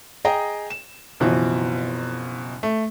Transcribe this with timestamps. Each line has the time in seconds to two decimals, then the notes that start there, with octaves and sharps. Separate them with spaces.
0.25 G#4 D#5 G5 A#5
0.70 E7
1.20 F#1 B2 E3 F3 C4
2.63 A3